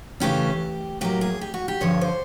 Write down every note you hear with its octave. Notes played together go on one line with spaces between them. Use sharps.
C#3 E3 A3 C#4 G4
A2 F#3 A#3 G4
G#4
G4
F#4
G4
G2 D3 F3 C#5
C5